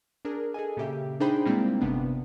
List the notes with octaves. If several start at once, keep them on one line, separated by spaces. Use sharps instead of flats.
D4 G#4 A#4
G#4 A4 D#5 G#5
A#2 C#3 G4 E5
D4 D#4 G#4 C5 G5 B5
A#2 G3 G#3 A#3 C4 E4
G1 C3 B3 D4